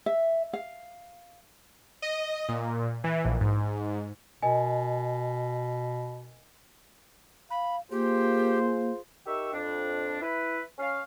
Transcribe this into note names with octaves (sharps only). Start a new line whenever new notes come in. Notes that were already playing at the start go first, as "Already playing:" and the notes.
E5
F5
D#5
A#2
E3
A#1
G#2
B2 A#4 D#5 G#5
F5 B5
A#3 F4 G4 G#4 C5
D#4 G4 A#4 E5 C#6 E6
F2 D4
E4 B4
C#4 F5